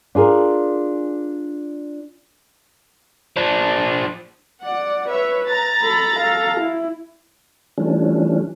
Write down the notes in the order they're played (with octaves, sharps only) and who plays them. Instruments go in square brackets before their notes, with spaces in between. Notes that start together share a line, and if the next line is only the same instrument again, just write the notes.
[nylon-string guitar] D4 F4 G#4 A#4
[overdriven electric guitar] F3 D4
[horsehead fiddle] D5 [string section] F#5
[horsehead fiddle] B4 [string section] C#5 E5
[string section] A#5 A6
[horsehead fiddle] A4 B5
A4 F5
E4
[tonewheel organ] E3 F3 G3 A3 C#4 D4